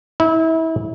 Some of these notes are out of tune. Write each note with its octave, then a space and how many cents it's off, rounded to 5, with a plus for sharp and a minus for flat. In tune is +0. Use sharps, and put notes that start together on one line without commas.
E4 -30